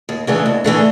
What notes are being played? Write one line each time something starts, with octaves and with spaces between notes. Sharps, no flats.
D#2
C#3 E3 A3 D4
D#2
C#3 E3 A3 D4